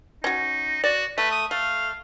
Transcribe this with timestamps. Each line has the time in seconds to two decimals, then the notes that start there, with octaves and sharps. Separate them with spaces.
0.24 C#4 D#4 F#4
0.84 F#4 D5
1.18 A3 B4
1.31 D#6
1.51 A3 F5